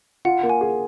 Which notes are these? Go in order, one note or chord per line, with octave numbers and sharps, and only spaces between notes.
F4 F#5
A#3
G#5
G#4